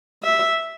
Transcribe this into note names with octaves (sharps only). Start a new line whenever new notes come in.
E5